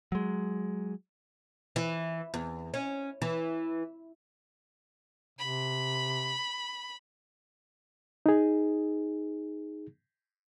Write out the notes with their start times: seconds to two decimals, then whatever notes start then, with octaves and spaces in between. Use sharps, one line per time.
0.12 F#3 G#3
1.76 E3
2.34 E2
2.74 C#4
3.22 E3
5.39 C3 B5
8.26 D#4 G#4